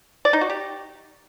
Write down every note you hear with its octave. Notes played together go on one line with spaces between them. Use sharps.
D5
D#4
F#4
G4